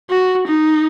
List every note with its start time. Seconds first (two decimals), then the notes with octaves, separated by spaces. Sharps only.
0.10 F#4
0.47 D#4